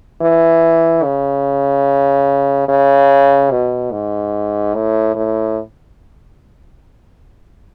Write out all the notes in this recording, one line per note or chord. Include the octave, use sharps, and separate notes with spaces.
E3
C#3
C#3
B2
G#2
A2
A2